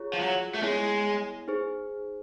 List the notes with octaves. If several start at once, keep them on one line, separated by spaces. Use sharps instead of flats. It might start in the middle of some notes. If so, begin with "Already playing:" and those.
Already playing: F4 G#4 C#5
F3
F#3
A3
G#3 B3 E4 G#4 C#5
D#4 G#4 C5